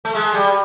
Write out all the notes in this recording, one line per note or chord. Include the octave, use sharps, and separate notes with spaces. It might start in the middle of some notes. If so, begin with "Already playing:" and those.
A3
G#3
G3